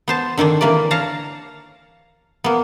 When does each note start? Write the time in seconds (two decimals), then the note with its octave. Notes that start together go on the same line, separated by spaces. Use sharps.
0.08 B3 C5 A5
0.38 D3 D#3 C4 D4
0.61 D3 E3 A#3 B4 D5
0.91 C#5 F5 A5 A#5
2.44 A#3 B3